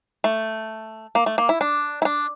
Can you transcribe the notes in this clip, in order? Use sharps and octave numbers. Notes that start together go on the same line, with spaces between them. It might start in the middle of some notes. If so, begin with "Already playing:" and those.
A3
A#3
A3
A#3
E4
D4
E4
D4